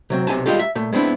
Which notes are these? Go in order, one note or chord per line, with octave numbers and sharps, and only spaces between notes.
C3 F#3 C4
B1 C3 E4 G#5 A5
G3 G#3 F4 G4 A4
E5
A#2 A3
G#3 B3 C4 D4 E4